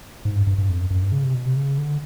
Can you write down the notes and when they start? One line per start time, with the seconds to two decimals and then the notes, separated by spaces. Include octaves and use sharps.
0.25 G#2
0.35 G2
0.47 G2
0.58 G2
0.69 F2
0.80 F#2
0.90 F#2
1.02 G2
1.12 C#3
1.23 C3
1.34 B2
1.46 C3
1.57 C#3
1.78 D3